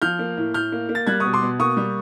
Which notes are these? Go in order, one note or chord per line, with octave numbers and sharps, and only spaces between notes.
F3 F6 G6
A#3
A2
A2 F6 G6
A#3
A#3
A6
G3 F#6 G#6
B2 C#6 D#6
C6 D6
B2
A#3 C#6 D#6
G3